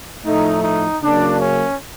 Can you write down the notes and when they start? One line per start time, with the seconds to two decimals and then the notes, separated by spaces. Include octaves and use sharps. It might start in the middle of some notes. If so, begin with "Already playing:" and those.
0.25 A2 F3 A3 D#4
0.63 D#4
1.02 C#3 F#3 A#3 D4
1.41 C#4